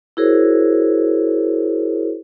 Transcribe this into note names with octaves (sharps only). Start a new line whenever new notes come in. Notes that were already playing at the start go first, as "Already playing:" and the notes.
E4 F#4 G#4 A#4 C5 C#5